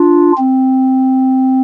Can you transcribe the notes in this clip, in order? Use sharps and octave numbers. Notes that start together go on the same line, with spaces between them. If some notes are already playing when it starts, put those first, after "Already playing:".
Already playing: D4 F4
C4